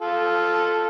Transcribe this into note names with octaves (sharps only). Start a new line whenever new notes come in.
F4 A4